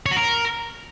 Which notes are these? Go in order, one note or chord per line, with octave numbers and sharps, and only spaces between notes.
C#5
F#4
A#4